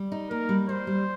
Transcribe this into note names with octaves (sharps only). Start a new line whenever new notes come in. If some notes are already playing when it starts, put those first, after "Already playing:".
Already playing: G3
D#4
A#3 A#4
G3
G3 C5
G3